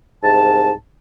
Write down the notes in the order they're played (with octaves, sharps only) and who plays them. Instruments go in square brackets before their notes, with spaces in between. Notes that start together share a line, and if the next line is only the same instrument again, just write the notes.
[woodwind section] C2 G#2 A5